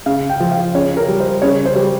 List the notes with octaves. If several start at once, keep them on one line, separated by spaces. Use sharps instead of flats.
C#3 F5
G5
F3
F5
C#3 C#5
A#4
G3
C5
C#3 C#5
C5
G3